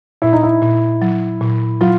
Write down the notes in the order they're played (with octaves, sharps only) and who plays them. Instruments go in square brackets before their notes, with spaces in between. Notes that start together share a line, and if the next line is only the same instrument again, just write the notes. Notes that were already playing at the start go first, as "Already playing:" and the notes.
[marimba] A#2 [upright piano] E4
[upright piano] D#4
E4
[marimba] A#2
F#3
A#2
[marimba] F#3 [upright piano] F4